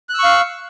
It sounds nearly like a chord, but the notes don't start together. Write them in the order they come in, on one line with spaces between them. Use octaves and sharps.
F#6 E6 C#6 F5